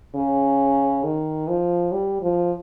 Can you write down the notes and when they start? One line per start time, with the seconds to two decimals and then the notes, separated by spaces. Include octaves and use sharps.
0.15 C#3
1.03 D#3
1.48 F3
1.92 G3
2.21 F3